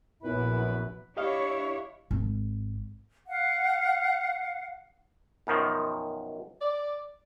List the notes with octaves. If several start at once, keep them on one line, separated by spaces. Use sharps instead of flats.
A#1 F#2 B3 E4 B4
D4 E4 G4 C#5 D#5 F5
G#1
F5 F#5
F#2 B2 D#3 F3
D5